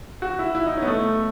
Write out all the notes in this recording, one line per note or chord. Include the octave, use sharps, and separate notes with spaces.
F#4
E4
E4
D#4
C#4
B3
A3